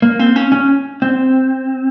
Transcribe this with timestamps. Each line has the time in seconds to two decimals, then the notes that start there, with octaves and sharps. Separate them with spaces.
0.02 A#3
0.19 C4
0.36 C#4
0.52 C#4
1.02 C4